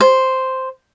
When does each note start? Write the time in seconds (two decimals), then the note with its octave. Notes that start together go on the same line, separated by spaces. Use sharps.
0.01 C5